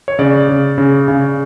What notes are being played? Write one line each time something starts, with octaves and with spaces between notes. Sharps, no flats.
C#5
C#3 D5
C#3
C#3
C#3